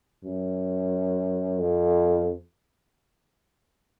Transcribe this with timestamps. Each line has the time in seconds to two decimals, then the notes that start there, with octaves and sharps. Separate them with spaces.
0.24 F#2
1.59 F2